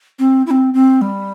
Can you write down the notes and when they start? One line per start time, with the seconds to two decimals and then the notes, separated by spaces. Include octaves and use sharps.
0.19 C4
0.46 E4
0.51 C4
0.74 C4
1.01 G3